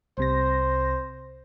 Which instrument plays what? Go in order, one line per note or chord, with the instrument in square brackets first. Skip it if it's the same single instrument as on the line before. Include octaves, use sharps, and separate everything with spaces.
[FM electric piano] C2 C3 A#6 [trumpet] C5